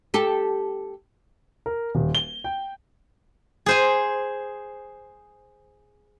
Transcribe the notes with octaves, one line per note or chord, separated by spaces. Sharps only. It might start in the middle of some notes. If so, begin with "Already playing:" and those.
G4 A4
A#4
D#1
G7
G5
G#4 C5 G#5